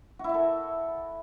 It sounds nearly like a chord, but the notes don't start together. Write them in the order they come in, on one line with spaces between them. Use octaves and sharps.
F#4 E4 E5 A4